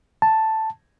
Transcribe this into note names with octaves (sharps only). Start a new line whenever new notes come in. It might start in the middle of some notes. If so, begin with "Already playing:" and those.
A5